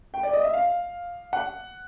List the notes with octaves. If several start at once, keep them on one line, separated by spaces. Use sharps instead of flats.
G5
D5
D#5
E5
F5
F#5